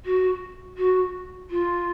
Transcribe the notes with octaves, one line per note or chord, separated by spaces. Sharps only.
F#4
F#4
F4